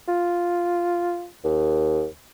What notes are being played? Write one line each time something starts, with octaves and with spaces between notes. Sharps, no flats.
F4
D#2